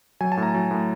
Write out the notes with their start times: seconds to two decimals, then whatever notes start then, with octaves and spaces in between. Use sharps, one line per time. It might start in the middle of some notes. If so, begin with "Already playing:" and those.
0.21 F#3 G#5
0.32 A5
0.37 A2
0.43 A#5
0.54 F#3
0.71 A2